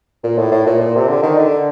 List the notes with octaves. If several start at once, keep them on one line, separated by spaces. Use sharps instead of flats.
A#2
A2
A2
A#2
A#2
C3
D3
D#3
D3